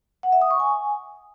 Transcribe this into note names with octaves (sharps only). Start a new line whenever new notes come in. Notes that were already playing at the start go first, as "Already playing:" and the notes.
F#5
E5
D#6
C#6
G#5